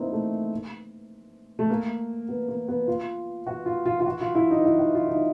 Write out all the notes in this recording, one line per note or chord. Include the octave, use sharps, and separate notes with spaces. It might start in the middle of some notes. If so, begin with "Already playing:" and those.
Already playing: A#3 C4 D#4 E4
A3
A3
A#3
B3
A#3
B3
F4
F#4
F4
F4
F4
F#4
F4
E4
D#4
E4
F#4
F4
D#4